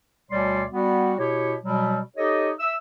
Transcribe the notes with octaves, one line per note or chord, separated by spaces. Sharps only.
D2 B2 G3 C#5 D5 C6
G3 B3 F#4
B2 E4 G4 C#5
B2 F#3 G3
D#4 G4 A4 C#5 D#5
E5 E6